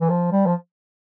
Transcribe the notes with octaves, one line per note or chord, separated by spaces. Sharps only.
E3
F3
G3
F3